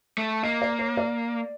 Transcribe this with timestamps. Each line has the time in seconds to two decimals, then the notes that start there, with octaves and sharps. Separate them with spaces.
0.18 A3
0.43 A#3 D#5
0.62 D5
0.79 C#5
0.97 D5